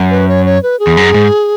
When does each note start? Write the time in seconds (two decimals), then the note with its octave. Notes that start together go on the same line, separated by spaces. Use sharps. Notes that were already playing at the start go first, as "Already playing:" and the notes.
Already playing: F#2
0.11 B4
0.28 C#5
0.46 C#5
0.63 B4
0.80 G#4
0.87 E2
0.97 F#2
1.14 G#2